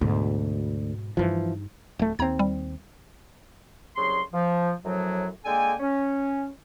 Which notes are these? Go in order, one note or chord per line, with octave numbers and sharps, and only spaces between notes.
D2 G#2 B2
G2 E3 F3 D#4
D1 A3
D#2 C4 A#5 G#6
G3
C2 C#3 F#3 C6
F3
F#2 A2 F3 F#3
D3 G#3 A#3 A4 G5 G#5
C#4